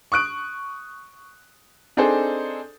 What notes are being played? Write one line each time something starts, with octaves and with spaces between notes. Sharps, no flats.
C#6 D#6 F#6 D7
C4 D4 D#4 G#4 A4 C5